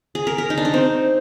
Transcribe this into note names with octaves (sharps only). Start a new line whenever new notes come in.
G#4
A#4
A#4
D#4
D4
D#4
C4